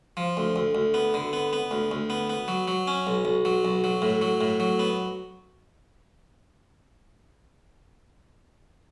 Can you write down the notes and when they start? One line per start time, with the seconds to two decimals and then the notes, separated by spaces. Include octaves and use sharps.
0.17 F3
0.37 D2
0.56 D2
0.75 D2
0.94 B3
1.14 D3
1.33 B3
1.53 B3
1.71 D2
1.91 D2
2.10 B3
2.30 B3
2.48 F#3
2.68 F#3
2.87 C#4
3.07 B1
3.25 B1
3.45 F#3
3.65 B1
3.84 F#3
4.02 A2
4.22 F#3
4.41 A2
4.60 F#3
4.79 B3